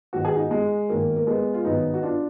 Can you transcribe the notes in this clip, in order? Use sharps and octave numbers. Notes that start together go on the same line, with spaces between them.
G#2 D#3 F#3 F#4
G#4
D#4 F#4
G#3
G#2 D#3 F#3 A#3
A#3
G#3 B3
F4
G#2 D#3 F#3 B3 D#4
F#4
D4 F4